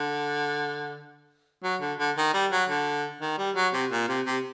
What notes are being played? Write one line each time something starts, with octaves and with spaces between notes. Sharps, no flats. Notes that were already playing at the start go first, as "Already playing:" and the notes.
Already playing: D3
F#3
D3
D3
D#3
G3
F#3
D3
D#3
G3
F#3
C3
A#2
C3
C3